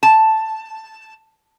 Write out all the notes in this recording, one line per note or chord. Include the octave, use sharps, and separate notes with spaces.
A5